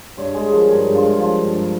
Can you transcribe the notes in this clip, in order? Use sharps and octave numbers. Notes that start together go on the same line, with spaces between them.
G2 C#5
G#3 G#4
F3 A#4
A#4
G2 G#4
G2
F4
G#3
F3 F4
G2
G2